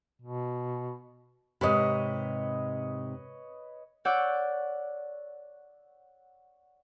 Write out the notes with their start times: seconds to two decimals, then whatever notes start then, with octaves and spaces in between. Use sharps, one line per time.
0.22 B2
1.61 G#2 C3 B4 C#5 D#5
4.05 C#5 D5 F#5 D6 E6 G6